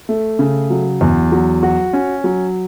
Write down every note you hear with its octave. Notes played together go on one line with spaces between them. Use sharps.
A3
C#3
F#3
E2
F#3
F#4
C#4
F#3